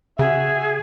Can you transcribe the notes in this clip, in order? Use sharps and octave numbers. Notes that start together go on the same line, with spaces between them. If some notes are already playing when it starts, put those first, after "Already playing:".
C#3 F#4 G#4 E5